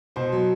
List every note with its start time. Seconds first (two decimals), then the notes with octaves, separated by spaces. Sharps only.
0.16 B2 C5
0.32 F#3